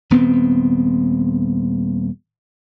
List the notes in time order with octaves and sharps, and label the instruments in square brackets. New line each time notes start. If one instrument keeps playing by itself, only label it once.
[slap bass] D#1 B3 C4